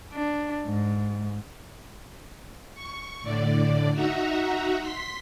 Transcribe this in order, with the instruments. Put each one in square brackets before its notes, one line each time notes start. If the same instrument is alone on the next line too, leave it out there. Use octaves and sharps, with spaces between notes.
[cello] D4
G#2
[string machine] C#6
A2 D3 D5
D#4 F#4 E5 F#5 A#5
C6 B6